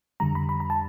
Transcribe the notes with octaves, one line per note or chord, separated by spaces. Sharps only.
F2 D3 G3 A#5
B5
B5
A#5
A5